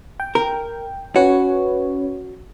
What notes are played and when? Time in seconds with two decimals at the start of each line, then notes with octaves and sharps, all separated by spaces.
0.20 G5
0.35 A#4
1.16 C#4 F#4 B4 C#5